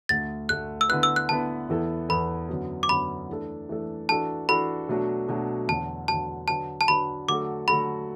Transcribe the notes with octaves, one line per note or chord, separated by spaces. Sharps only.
D2 D3 A3 A6
D2 D3 A3 F#6
E6
D3 B3 E4 B4 F#6
E6
F#6
D3 B3 E4 B4 A5
E2 E3 B3 E4 A4
E2 E3 B3 E4 A4 B5
F#2 D3 F#3 B3
D6
F#2 D3 F#3 B3 B5
E3 A3 D4 A4
E3 A3 D4 A4
E3 D4 F#4 A4 A5
E3 D4 F#4 A4 B5
B2 F#3 A3 D4 F#4
B2 F#3 A3 D4 F#4
E2 D3 F#3 A5
E2 D3 F#3 A5
D3 F#3 D4 B4 A5
A5
D3 F#3 D4 B4 B5
D3 F#3 A3 F#4 A4 D6
D3 F#3 A3 F#4 A4 B5